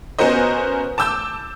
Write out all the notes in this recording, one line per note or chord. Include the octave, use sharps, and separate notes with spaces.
B3 C#4 F#4 A#4 C5 D#5
A5 D6 E6 G6